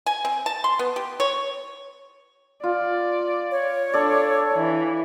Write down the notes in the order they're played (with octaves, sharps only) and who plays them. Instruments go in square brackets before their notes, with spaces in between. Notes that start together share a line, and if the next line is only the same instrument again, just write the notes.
[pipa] G#5
C4
A5
C6
B3
G4
C#5
[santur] F4 [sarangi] D5
[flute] C#5
[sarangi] D4 [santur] A4 D5
[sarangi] E3